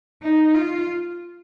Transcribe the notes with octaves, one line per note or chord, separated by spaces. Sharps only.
D#4
F4